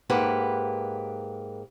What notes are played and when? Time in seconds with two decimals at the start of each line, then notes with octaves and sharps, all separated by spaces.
0.10 G#2 A#3 G4 B4 F#5